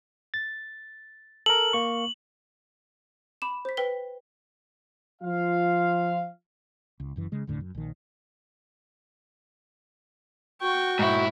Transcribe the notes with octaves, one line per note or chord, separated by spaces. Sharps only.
A6
A4 A#4 F#7
A#3 C#6
B5 D6 E7
C5 B6
B4 G5 B6 G7
F3 F4 F5
C#2
F#1 F#2 E3
C#3 G#3
F1 D2 A2 D3
F#2
A#1 D#3
F#4 G5 C#6
G#2 E4